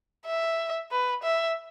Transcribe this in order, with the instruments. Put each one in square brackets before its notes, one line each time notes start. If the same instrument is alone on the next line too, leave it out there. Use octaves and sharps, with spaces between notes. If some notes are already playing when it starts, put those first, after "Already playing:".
[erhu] E5
B4
E5